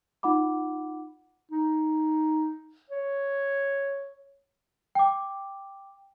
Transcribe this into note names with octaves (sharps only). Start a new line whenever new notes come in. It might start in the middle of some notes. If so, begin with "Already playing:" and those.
D#4 F4 F#5 B5 D6
D#4
C#5
G5 D6